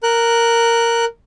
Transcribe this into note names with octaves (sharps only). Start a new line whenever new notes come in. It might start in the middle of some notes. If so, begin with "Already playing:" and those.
A#4 F#6